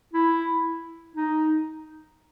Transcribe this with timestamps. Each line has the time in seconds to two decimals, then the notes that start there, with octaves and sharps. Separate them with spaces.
0.13 E4
1.16 D#4